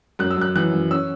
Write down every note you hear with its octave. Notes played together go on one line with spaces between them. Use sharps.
F#2 F#6
E6
F#2 F#6
E3 F#6
F#2
C#4 E6